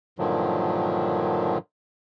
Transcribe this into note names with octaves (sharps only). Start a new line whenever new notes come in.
G2 A#2 D3 D#3 F3 F#3